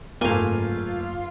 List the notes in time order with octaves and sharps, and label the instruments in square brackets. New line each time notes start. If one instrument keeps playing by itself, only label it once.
[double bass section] F#1 G#2 [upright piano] A3 A#3 [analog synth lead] F4 [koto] F5 G#5